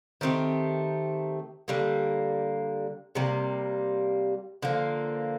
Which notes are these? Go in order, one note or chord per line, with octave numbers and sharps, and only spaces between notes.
D#3 A3 C4 G4
D3 G3 A#3
C3 G3 A#3
D3 F3 A#3